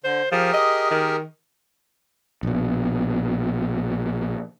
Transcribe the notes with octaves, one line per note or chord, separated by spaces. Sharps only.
D3 C5
F3 G4 G#4 A#4
D#5
D#3
A#1 B2